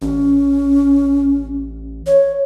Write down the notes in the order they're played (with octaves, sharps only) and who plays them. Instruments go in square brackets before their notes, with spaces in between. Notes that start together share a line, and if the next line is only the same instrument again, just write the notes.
[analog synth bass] A1 [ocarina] C#4
[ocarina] C#5